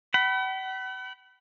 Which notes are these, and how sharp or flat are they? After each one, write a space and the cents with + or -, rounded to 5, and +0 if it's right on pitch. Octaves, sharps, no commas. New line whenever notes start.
F#5 +45 B5 +0